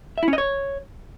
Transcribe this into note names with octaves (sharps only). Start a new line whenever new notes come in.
E5
E4
C#4
D#5
C#5